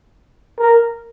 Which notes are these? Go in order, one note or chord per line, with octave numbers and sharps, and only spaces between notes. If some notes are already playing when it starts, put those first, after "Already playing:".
A#4